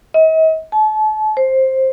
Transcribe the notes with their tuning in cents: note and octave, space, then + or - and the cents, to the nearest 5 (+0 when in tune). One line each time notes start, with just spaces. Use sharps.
D#5 +45
A5 -35
C5 +10